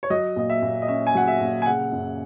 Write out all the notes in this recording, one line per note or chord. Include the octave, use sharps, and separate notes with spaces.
C#5
F#3 D#5
A#2 D#5
E5
A#2
D#5
C#4 E5
G#5
F#3 F#5
E5
A#2
G#5
C#3 F#5
F#2